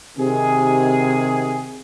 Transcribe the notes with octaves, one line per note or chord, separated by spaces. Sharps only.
C3 D#3 G#4